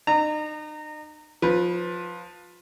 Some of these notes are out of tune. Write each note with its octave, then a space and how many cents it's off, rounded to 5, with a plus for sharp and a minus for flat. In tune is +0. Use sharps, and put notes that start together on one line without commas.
D#4 -40 A#5 -20
F3 +20 B4 +0